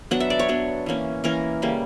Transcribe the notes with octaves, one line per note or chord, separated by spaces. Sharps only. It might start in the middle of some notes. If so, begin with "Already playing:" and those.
F#3 B3 D4 F#5
E5
D5
C#5
F#3 B3 D4
E3 A#3 C#4
E3 A#3 C#4 A#4
C#3 G3 A#3